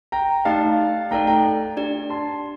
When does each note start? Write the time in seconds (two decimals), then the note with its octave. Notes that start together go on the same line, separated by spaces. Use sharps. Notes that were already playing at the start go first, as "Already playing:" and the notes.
0.12 G5 A#5
0.45 A3 D#4 G4 D5 F5 A5
1.11 A3 D#4 A4 D5 G5 A#5
1.27 G5 A#5
1.77 D4 G4 D5
2.10 A5 C6